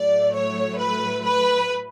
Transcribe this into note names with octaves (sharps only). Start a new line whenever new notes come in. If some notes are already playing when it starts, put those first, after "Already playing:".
Already playing: A2 F#3 A3 D5
C#5
B4
B4